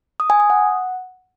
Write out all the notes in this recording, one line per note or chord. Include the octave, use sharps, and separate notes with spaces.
D#6
G#5
D#6
F#5